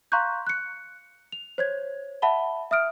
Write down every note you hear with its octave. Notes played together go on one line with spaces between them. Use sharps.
F5 A#5 C6 C#6 F#6 G6
F#6 C#7
F7
C5 C#5 G#6
E5 F#5 A5 B5 G7
E5 D#6 F6 D7